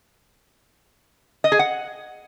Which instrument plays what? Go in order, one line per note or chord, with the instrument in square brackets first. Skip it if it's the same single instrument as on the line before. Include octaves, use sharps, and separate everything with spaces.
[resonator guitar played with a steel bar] D#5
G#4
F#5